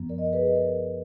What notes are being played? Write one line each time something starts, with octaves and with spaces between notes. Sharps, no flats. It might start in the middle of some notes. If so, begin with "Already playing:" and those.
Already playing: F#2 F3 B3
A#4 D5
D#5
D5
G#4 B4
D#5
A#4 D5